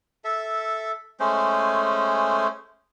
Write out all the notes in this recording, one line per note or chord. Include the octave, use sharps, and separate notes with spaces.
A4 E5
G#3 A3 C#4 C5